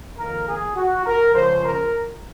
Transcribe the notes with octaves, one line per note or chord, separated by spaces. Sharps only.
F2 D#3 A#3 A#4
G#4
F#4
A#4
C#2 C#3 F3 C5
A#4